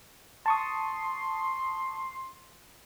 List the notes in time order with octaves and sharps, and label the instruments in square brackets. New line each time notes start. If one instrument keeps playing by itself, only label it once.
[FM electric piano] A5 C#6 D#6 [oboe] C6